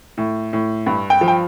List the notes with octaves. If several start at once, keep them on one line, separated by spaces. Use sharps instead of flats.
A2
A2
G2
G5
F3
G5